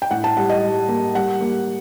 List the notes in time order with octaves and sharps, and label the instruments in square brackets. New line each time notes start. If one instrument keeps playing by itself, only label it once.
[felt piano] G5
A2 F#5
A5
G3 F#5
D#5
G3
A#3
G3 F#5
A#3